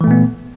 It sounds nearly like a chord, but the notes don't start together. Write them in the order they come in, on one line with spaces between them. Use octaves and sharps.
E3 A3 A#2 B3